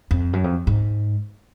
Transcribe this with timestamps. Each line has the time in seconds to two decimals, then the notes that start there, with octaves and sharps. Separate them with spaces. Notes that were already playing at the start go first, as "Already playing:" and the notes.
0.11 F2
0.33 F#2
0.44 F2
0.67 G#2